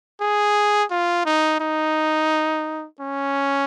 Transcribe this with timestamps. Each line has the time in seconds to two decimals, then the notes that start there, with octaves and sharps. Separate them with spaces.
0.21 G#4
0.91 F4
1.26 D#4
1.60 D#4
3.00 C#4